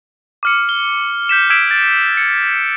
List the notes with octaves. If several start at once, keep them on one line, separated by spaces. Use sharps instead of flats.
D6 F6 C#7
G7
G6 B6 E7
E6 G#6 B6 D7 E7
A6
C#7